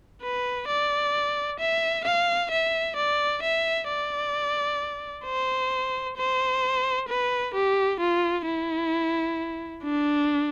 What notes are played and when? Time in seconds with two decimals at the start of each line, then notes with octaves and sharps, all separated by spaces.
0.22 B4
0.68 D5
1.59 E5
2.05 F5
2.51 E5
2.96 D5
3.42 E5
3.88 D5
5.25 C5
6.17 C5
7.08 B4
7.54 G4
8.00 F4
8.46 E4
9.83 D4